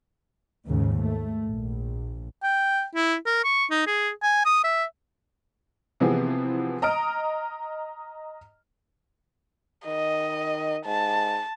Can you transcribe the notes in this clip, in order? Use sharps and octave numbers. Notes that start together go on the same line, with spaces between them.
D#2 G#2 C#3
A3
A#1
G5
E4
A#4
C#6
D#4
G#4
G#5
D#6
E5
C3 E3 F3 B3 C4 G#4
D#5 A#5 D#6 F6 D7
D#3 D#5
G#2 A5